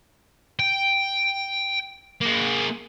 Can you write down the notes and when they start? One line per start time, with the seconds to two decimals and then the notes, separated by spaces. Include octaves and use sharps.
0.60 G5
2.21 A#3 G#4